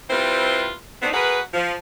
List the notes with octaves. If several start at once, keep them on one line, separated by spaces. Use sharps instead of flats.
G3 C4 E4 F4 B4 C5
A3 B3 C4 D4 D#4
F#4 G#4 A#4 B4
F3